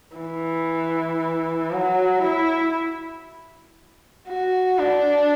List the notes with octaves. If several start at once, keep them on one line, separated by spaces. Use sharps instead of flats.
E3
F#3
E4
F#4
D4